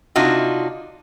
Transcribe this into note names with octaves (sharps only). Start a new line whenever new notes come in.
C3 D4 D#4 F4 F#4